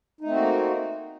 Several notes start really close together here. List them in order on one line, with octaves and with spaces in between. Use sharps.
D#4 A3 C4 F#4 A#3